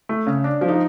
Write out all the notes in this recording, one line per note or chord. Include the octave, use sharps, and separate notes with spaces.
A3
C#3
D4
F3
D#4